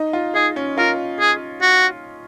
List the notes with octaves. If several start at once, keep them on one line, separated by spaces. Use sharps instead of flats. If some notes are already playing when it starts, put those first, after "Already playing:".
Already playing: D#4
F4
D#4 G#4
C#4
F4 A#4
G#4
F#4